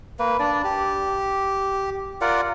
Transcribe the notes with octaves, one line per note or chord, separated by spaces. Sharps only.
A#3 B4
D4 D5
G4
F4 A#4 D5 F#5